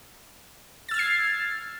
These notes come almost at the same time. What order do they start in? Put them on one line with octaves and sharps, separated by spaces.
A6 E6 F6 G#6 C7